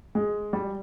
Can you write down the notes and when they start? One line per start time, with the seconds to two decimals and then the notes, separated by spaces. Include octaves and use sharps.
0.15 G#3
0.53 G3